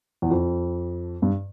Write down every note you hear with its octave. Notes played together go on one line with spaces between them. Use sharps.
E2
F2
G2